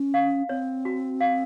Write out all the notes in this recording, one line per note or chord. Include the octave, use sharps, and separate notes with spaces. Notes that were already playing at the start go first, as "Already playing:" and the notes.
Already playing: C#4
F5
C4 C#5
F#4
F5